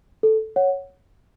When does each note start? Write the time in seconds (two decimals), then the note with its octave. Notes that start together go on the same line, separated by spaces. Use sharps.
0.23 A4
0.56 C#5 F#5